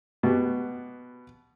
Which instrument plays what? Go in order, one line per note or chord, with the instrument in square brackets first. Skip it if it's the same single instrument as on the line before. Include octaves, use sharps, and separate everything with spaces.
[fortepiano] B2 B3 G4